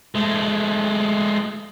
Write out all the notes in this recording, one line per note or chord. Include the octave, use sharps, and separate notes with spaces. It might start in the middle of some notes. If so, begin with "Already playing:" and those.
G#3 A3